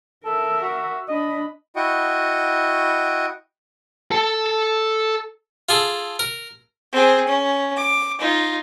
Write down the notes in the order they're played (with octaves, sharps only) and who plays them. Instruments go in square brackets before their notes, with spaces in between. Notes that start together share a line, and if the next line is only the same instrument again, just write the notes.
[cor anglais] A4 [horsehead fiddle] A#4 E5
[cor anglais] F#4
[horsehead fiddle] D4 B5 [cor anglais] D#5
[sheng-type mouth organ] E4 F#4 D#5 G5 C#6
[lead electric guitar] A4 A5
[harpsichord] F4 G#4 A4
A#4
[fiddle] C4 G#4
C#4
D6
D#4 F4